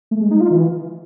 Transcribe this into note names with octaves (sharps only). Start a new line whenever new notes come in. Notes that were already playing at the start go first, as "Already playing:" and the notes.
A3
G#3
D#4
F4
E3